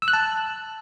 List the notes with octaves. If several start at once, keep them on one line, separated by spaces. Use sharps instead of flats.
E6
F#6
A5